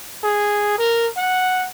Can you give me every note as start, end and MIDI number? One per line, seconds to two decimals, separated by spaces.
0.24 0.78 68
0.78 1.07 70
1.17 1.67 78